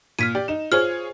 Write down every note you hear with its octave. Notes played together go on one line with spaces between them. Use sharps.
A#2 F6 B6 D#7
G4 D5
D#4 E7
F4 G#4 C5 C#5 F6